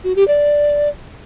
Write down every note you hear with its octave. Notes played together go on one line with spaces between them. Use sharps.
F#4
G4
D5